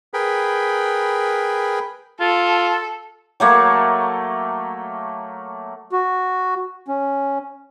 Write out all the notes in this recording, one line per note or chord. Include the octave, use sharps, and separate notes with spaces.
G#4 A#4 B4 G5 B5
F4 A4
F#3 A3 A#3
F#4
C#4